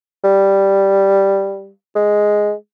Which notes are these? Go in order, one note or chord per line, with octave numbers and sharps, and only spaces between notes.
G3
G#3